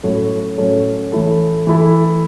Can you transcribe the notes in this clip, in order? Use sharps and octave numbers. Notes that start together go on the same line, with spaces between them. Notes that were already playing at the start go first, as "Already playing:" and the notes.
A2 F#3 C#4 A4 C#5
A2 F#3 C#4 A4 C#5
E3 A3 E4 A4
E3 A3 E4 A4